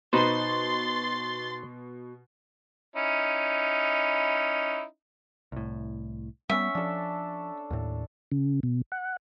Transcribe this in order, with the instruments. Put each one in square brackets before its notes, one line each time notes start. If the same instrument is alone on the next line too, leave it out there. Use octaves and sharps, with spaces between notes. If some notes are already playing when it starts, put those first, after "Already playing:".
[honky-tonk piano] B2 [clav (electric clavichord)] D#4 B4 C5 [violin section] C6 A6
[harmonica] C#4 D#4 E4
[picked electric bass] C2 A2
[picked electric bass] G3 B3 [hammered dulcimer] C#4 F#5 [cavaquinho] E5
[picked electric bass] F3 [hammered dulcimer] D4 A4
[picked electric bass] D#2 A2
[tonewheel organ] C#3
B2
F#5